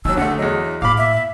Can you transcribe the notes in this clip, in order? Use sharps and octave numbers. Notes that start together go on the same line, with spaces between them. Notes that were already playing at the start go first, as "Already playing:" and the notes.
D#2 F#3 D4 E6
D2 A3 F#5
E2 F#3 D#5
A2 A#3 F5 B5 D6
E5